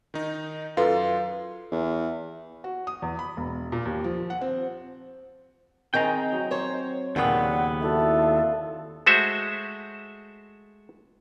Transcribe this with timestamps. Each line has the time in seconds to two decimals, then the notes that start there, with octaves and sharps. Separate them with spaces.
0.14 D#3 D#4
0.77 F#2 F4 A4 B4 F5 C6
1.72 E2
2.64 F#4
2.87 D#6
3.02 E2
3.19 B5
3.37 E1
3.72 A#2
3.85 D#2
4.04 F3
4.30 F#5
4.41 C4
5.94 D#3 C4 D#4 G#4 G5 A#5
6.32 F#3 C4
6.51 C5 C#5
7.16 D#2 A#2 C#3 B3 F#5 G5
7.81 E4 F#4 A4 D5
8.19 F5 C6
9.06 G#3 A3 F#4 C5 E5